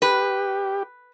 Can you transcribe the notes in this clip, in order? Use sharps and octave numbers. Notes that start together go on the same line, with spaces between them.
G4 B4